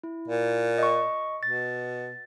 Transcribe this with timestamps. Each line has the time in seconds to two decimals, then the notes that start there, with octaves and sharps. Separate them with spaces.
0.03 E4
0.28 A#2
0.78 D#5 C#6
1.43 B2 A6